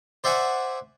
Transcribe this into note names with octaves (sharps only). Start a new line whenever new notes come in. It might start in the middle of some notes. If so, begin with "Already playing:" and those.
C5 D5 E5 F#5 G#5